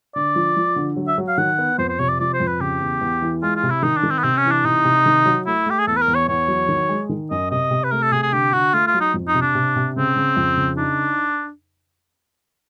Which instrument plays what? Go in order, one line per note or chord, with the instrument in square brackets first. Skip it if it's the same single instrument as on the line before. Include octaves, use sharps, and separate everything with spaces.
[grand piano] D3 [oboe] D5
[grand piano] F3
F3
D3
F#3
[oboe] E5
[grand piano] F#3
[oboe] F5
[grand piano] D#3 [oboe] F#5
[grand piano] B3
[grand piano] F2 [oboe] C5
[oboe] C5
[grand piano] C3 [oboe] C#5
[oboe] D5
[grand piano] F3 [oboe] D5
[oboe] C5
[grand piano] F2
[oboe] B4
[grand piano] C#3 [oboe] G4
[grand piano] E2
E2
E3
[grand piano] G#3 [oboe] F4
[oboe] F4
[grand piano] C3
[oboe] E4
[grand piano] D#3 [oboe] D#4
[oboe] D4
[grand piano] D#3
[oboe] C4
B3
[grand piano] C3 [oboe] C4
[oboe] C#4
[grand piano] E3
[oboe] D4
[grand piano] C3 [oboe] D#4
[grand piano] C3
D#3
F#3
[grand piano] A3 [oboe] E4
[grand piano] A3 [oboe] G4
[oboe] G#4
[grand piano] E2 [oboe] A4
[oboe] B4
A#4
[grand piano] E2
[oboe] C#5
[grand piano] E2 [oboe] C#5
[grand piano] F#3
D#3
G#3
D#3
[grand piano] F#2 [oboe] D#5
[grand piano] C3 [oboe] D#5
[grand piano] C3
[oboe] B4
[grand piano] A3 [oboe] A#4
[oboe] A4
[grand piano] C3 [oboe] G#4
[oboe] G#4
[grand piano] D3 [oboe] G4
[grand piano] D3 [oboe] F#4
[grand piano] A3 [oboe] F4
[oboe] F4
[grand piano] F#3
[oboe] D#4
[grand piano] F2
[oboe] D#4
[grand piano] C3
[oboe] D4
[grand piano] C3
C3
[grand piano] C#3 [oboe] C4
[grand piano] C#3
F2
C#3
[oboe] D4 [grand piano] D#4